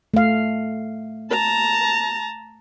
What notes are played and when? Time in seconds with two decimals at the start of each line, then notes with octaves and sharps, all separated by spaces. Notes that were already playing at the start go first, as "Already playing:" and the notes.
0.14 A3 F5
1.31 A5 A#5